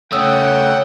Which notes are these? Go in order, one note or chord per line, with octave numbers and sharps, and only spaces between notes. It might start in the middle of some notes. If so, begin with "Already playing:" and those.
C#3 A3 C#5 F#5 G5 D#6 E6